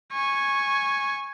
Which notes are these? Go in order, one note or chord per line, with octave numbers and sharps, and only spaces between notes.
G#5 C#6